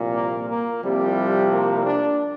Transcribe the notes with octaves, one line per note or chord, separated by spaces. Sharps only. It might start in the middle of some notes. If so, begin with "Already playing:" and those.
Already playing: C2 A#2 F3
A#3
A#3
C2 C3 F3 G3
A#3
D4